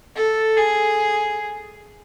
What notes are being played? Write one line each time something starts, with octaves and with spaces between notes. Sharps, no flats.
A4
G#4